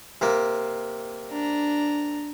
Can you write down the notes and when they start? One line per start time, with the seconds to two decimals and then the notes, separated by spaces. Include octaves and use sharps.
0.21 C3 A#3
1.31 D4 A#5